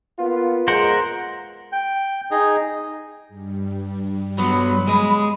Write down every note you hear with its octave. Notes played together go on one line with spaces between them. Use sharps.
A#3 B3 F4
G#3 A#4 C5 F#5
G5
D#4 G#4
G2 G3
F#3 B3 B5
G#3 D#5